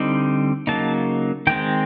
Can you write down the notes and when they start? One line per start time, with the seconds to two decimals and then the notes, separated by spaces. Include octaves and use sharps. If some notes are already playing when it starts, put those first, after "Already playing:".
Already playing: D3 G3 C4 D#4
0.67 C#3 F#3 A#3 D#4 A5
1.47 D#3 G#3 C4 G5